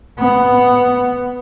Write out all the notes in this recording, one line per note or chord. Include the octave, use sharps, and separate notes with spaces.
B3